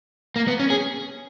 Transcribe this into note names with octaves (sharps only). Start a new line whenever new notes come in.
A#3
B3
C#4
G#4